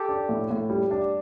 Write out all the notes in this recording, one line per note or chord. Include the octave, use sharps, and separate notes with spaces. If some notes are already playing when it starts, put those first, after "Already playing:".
Already playing: G4 A4
D4
A2
A2
G3
D4